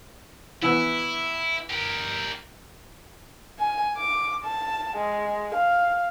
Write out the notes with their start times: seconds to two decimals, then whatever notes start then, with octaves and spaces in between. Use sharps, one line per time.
0.62 E3 B3 E4 E6
1.70 G4 A#4
3.59 G#5
3.98 D6
4.44 A5
4.97 G#3
5.55 F5